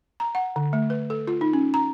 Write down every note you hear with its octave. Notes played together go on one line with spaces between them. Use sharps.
A#5
F#5
D3
A3
B4
A4
F4
D#4
C#4
A#5